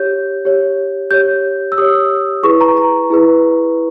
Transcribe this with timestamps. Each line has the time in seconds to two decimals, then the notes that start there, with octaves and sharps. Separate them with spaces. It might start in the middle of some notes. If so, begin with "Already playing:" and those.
Already playing: G4 C#5 G6
0.45 G4 C#5
1.11 G4 C#5 G6
1.72 E6
1.78 G4 C#5 D#6
2.43 E4 G#4 B4 C#6
2.61 A#5
2.77 A#5
3.10 E4 G#4 B4